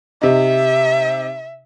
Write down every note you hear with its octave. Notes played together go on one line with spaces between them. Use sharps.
C3 D#4 E5